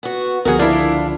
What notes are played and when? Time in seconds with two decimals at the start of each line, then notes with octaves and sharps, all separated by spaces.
0.03 B3 F#4
0.45 C#2 D3 F3 B3 F#4 G#4 A#4 F#5
0.59 D4 E4 F4 D5